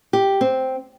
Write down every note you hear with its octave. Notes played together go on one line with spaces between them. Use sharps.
G4
C4